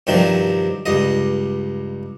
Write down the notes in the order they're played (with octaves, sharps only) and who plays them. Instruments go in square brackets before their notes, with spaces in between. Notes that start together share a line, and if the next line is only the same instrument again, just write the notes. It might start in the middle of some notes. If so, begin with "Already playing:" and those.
[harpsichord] G2 C3 D#3 F3 F#3 D4
C#2 G2 D#5